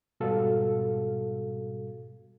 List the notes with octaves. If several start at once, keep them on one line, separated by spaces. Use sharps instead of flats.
G#2 B2 G3 F#4 A4 F5